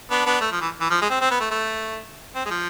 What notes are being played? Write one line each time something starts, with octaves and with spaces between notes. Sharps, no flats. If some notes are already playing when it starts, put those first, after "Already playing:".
B3 D4
B3 D4
A3
F3
E3
E3
F3
G#3
C4
C4
B3
A3
A3
C4
G#3
F3